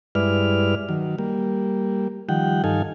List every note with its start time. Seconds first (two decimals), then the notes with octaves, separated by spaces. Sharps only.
0.15 G2 G#3 E4 B4 D5 F6
0.89 D#3 F#3
1.18 G3 A#3
2.29 D#3 F3 G3 F#5 G5
2.64 G2 D#3 D#4 A4 F5 G#5